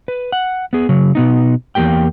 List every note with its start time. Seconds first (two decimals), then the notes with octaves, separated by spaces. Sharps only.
0.08 B4
0.32 F#5
0.73 B3 G#4
0.89 C#3 F#3
1.15 B2 B3 D#4
1.75 E2 G3 A#3 G4 G5